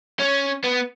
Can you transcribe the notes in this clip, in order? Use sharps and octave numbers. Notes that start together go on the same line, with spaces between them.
C#4
B3